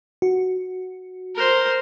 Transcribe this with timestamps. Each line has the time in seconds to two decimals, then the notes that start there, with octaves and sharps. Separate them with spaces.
0.22 F#4
1.35 A#4 C5